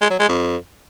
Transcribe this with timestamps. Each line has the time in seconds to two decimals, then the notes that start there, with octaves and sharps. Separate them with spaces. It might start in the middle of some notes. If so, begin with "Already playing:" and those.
0.01 G#3
0.11 F#3
0.20 G#3
0.29 F2